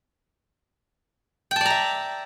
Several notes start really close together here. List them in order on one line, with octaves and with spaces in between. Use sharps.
G5 A5 D5 A#5 E5